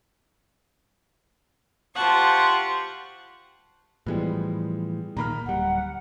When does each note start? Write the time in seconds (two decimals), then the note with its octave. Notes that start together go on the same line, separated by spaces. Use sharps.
1.94 F4 G4 C5 F#5 A5 C#6
4.06 A2 E3 F3 G3 G#3 B3
5.17 A#2 D#3 A#3 A#5 B5 F6
5.46 D1 G3 F#5